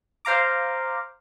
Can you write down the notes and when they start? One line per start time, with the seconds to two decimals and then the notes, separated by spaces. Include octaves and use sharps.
0.25 C5 F5 A#5 D6